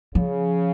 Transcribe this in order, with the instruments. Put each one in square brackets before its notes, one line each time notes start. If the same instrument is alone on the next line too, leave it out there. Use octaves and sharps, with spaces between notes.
[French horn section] C#3 [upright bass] F3